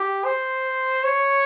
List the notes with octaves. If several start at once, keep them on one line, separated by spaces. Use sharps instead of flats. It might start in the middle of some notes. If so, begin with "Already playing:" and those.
Already playing: G4
C5
C#5